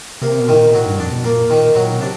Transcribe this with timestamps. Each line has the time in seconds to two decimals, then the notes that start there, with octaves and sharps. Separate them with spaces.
0.22 C3 A#3
0.40 B2
0.48 A2 D#3
0.56 A#2
0.74 A2 F#3
0.86 G2
0.99 F2 D4
1.12 B2
1.24 A#2 A#3
1.50 D#3
1.75 A#2 F#3
1.92 B2
2.00 C3 D4